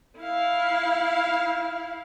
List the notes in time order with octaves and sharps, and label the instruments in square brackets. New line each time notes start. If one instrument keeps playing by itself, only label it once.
[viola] E4 F5